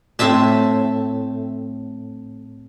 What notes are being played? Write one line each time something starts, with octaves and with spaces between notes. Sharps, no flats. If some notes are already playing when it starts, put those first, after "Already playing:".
A2 A3 C4 E5 A5